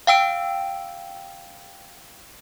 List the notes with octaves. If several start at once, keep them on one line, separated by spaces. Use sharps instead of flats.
F5 G5 E6 D7